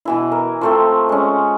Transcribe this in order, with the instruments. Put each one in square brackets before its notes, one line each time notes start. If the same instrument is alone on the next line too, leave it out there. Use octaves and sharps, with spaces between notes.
[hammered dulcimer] B2 E3 E4
A#4
F3 A3 C4
G#3 C#4